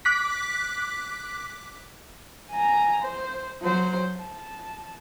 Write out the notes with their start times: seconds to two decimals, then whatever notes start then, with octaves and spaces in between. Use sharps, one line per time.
0.05 D6 F#6 B6
2.52 G#5 A#5
3.02 C5
3.62 F#3 C5
4.18 A5